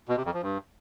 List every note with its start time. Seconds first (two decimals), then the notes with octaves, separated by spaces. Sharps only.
0.08 B2
0.17 C3
0.25 F2
0.34 F3
0.42 G2